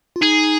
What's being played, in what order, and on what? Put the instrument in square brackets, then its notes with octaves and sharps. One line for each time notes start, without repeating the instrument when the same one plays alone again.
[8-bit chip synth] F4
[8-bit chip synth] D#4 [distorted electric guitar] G#4